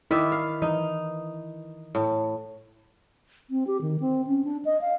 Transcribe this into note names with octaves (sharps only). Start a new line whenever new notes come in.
D#3 E4 D5 E5
F5
E3 D#4
A2
C4
G4
D#3
C4
C#4
D4
D#5
F5